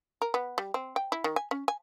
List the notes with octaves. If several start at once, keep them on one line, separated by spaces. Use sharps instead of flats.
A#4
B3
G3
C4
G5
E4
D#3
G#5
C#4
G#5